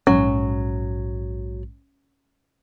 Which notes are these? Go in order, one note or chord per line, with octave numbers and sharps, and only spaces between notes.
A#1 G#2 F#3 C#4